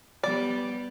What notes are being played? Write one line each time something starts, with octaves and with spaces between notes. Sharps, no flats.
G3 B3 D5